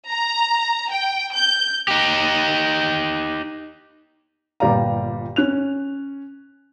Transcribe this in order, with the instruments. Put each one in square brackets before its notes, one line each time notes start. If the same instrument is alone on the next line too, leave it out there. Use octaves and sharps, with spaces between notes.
[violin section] A#5
G5
G6
[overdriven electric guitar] D#4 G4
[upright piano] G1 A#2 G3 D5 F5 A#5
C#4 F#6 F7